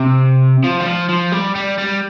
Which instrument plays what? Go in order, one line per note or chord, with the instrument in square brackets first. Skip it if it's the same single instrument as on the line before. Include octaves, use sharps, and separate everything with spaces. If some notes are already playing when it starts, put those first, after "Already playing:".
Already playing: [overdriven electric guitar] C3
F3
G3
F3
F3
G3
G3
G3